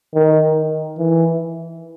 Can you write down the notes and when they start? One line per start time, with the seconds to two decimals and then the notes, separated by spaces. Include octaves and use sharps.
0.15 D#3
0.98 E3